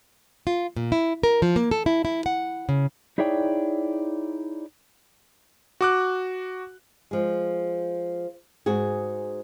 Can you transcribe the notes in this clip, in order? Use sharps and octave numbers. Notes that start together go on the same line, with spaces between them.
F4
A#2
E4
A#4
F3
A#3
A4
E4
E4
F#5
C#3
D#4 E4 G#4 C#5 D5 G5
F#4 D6 F#6
F3 G#3
G#2 F#4 G#4